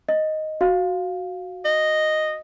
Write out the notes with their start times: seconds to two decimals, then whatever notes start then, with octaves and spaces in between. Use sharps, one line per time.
0.09 D#5
0.61 F#4 F5
1.65 D#5